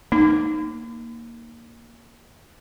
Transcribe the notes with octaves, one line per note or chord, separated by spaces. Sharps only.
A#3 D#4